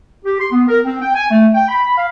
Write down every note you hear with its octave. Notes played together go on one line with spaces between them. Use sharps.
G4
C6
B3
A#4
C4
G5
G#5
A3
G5
B5
F5